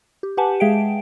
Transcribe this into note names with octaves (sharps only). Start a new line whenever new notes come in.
G4
G4 B4 F#5 G#5 A5
G#3 G#4 E5 F5 G5 D7